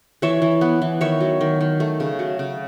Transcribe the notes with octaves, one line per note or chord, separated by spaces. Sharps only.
E3 C#5 E5
E3
B3
E3
D#3 C#5 E5
F#3
D#3
D#3
A3
C#3
F#3
C#3